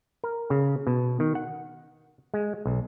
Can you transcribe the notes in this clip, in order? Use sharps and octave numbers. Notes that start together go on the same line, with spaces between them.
A#4
C#3
B2
D#3
F#5
G#3
B1